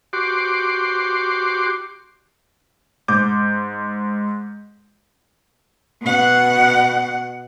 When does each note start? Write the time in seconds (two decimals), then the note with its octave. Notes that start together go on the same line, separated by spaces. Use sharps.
0.13 F#4 G4 C6 D6
3.08 G#2 D6 G6
6.02 B2 F#5